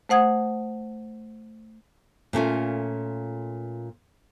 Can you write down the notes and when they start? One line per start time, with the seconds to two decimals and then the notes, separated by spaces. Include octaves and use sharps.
0.09 A3 C5 F#5 D#6 G#6
2.33 A#2 A3 C#4 F4